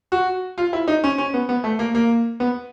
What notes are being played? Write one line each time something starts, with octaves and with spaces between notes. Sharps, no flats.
F#4
F4
E4
D#4
C#4
C#4
B3
B3
A3
A#3
A#3
B3